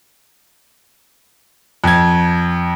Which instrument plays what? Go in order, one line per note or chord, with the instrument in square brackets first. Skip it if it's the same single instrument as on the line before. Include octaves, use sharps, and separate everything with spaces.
[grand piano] F2 G#6